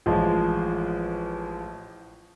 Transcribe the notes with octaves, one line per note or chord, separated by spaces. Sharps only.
A1 F3 G#3